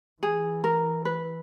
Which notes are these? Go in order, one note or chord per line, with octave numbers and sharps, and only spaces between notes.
E3 G#4
A#4
B4